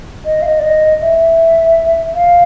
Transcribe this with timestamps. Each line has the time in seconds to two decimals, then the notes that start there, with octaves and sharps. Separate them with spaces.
0.25 D#5
0.42 F5
0.45 D#5
0.59 D5
0.62 D#5
1.01 E5
2.15 F5